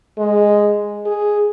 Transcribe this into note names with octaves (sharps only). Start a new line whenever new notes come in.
G#3
G#4